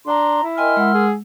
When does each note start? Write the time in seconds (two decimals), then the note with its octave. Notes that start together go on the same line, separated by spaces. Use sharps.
0.07 D4 A#5 C6
0.43 E4
0.58 A#4 D#5 G5 G#5 C6 F6
0.77 G#3 F#5 E6
0.94 G#4